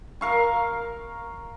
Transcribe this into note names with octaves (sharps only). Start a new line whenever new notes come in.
A#4 F5 C#6